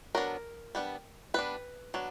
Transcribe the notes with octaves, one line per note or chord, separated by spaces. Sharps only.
F#3 B3 D4 A#4
G3 B3 D4
G3 B3 D4 B4
F#3 B3 D4